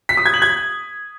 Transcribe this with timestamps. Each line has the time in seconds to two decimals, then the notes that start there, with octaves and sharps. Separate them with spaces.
0.09 B6
0.17 D#6
0.26 G#6
0.34 F#7
0.42 G#6